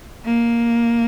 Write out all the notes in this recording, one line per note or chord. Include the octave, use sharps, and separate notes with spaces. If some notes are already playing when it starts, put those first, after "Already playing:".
A#3